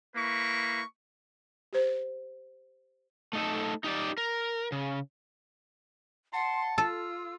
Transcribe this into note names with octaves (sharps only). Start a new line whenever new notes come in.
A#3 E4 B4 C#6
G4 C5
A3 D#4 A4
D#4 G4 D5
A#4
C#3
F#5 A5 C6
F4 A4 E6